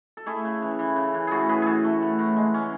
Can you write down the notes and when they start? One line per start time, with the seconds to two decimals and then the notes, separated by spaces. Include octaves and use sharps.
0.17 A4
0.26 A3 E4 G#4
0.44 C#3
0.62 E3
0.79 E3
0.96 C#3
1.14 E3
1.27 A2 F#4 G#4 A4
1.49 A2 G#4 B4
1.62 E3 F#4 G#4 A4
1.84 A3
2.02 A2
2.19 A2
2.36 G#3
2.54 C#4